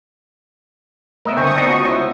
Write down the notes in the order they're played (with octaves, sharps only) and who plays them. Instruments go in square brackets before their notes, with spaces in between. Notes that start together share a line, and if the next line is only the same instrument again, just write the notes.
[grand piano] A3 B3 [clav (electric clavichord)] A#4 D#5 E5
[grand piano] D3 E5 G#5 [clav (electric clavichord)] C4 [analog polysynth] C#6 D#6
[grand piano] B3 [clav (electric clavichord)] C4 D4 D#4
[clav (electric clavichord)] C#2 F#4
[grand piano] E4 C5